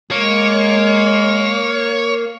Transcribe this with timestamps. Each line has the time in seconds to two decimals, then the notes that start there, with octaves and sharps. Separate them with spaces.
0.11 G#3 A#3 C#5